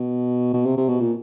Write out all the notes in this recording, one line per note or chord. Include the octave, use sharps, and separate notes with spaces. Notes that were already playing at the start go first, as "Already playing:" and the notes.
Already playing: B2
B2
C3
C3
B2
A#2